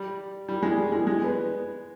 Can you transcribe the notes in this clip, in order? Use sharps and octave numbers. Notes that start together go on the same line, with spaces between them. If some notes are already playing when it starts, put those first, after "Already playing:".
Already playing: G3
G3
G#3
G3
G#3
G#3
B3